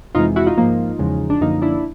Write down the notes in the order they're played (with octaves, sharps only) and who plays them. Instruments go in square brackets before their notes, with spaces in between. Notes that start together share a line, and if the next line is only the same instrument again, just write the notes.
[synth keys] F2 C3 E3 G#3 D#4 F4
E4 F#4
D#4 F4
G#2 F3 A#3
E2 C#3 F3 G#3
D4
F#2 D3 F3 A#3 D#4
D4 E4